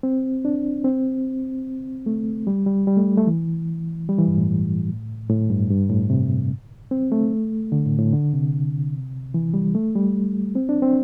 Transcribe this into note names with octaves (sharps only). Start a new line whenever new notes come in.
C4
D4
C4
A3
G3
G3
G3
A3
A3
E3
G3
E3
G2
A2
A2
G2
G2
A2
C3
C4
A3
D3
A2
A2
D3
C3
E3
G3
A3
G3
C4
D4
C4